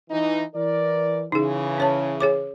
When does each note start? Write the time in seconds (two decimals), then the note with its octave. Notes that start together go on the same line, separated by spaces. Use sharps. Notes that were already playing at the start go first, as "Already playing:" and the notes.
0.11 E3 D#4
0.55 E3 A#4 D5
1.32 C#3 E3 D#4 G#4
1.78 C#4 C#5 A5
2.20 G#4 C#5 D6